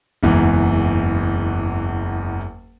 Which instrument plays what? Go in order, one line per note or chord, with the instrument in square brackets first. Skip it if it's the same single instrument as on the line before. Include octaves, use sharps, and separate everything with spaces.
[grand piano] F#1 E2 G#2 E3